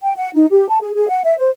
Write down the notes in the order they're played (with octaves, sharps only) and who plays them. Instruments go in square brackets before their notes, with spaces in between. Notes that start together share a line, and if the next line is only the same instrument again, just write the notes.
[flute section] G5
F#5
D#4
G4
A5
G#4
G#4
F#5
E5
C5